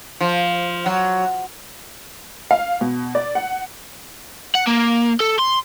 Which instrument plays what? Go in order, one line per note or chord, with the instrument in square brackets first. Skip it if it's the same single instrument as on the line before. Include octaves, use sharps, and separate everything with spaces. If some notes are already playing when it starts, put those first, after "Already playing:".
[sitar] F3
F#3
[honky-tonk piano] F5
B2
D5
F#5
[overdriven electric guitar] F#5
A#3
A4
C6